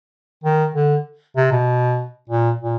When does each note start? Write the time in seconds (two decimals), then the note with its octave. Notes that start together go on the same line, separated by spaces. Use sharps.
0.44 D#3
0.75 D3
1.36 C3
1.52 B2
2.29 A#2
2.61 A#2